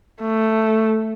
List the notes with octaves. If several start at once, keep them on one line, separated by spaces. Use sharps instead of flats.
A3